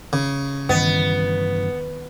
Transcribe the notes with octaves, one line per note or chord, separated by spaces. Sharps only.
C#3
G2 D#3 E3 B3